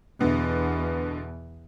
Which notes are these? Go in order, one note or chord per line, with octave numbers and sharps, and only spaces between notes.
E2 B2 D3